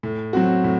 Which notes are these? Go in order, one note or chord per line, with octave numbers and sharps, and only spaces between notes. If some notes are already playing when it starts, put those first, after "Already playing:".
A2
F#3 C4 F#4
A2